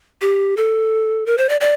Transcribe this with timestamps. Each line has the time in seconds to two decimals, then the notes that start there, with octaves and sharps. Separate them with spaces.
0.21 G4
0.57 A4
1.26 A#4
1.38 C5
1.49 D5
1.61 D5